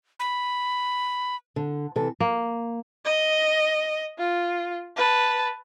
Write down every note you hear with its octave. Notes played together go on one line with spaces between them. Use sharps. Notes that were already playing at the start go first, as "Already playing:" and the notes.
B5
D3
C3 E3 A4
A#3
D#5
F4
B4 A5